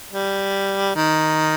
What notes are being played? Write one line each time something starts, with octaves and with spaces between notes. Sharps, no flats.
G3
D#3